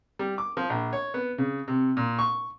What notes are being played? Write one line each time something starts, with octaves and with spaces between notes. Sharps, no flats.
G3
D6
F3
A#1
C#5
B3
C#3
C3
A#2
C#6